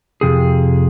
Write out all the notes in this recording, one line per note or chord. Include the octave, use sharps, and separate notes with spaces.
F2 C3 G#4